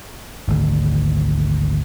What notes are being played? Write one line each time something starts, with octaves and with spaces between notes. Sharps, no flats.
G#1 D2